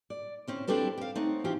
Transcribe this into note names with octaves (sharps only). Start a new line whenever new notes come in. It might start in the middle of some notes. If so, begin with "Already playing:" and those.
D5
C4 C#4 E4
C4 D4 E4 G4 A4 B4
F5 G5
A3 C4 D#4 C#5 F#5
E3 C4 C#4 F4 G4